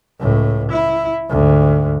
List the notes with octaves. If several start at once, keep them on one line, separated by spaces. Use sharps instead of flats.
C#2 A2
E4
D2 G#2